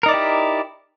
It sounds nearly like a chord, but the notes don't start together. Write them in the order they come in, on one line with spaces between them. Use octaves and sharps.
A#4 D#4 D5 E4 G4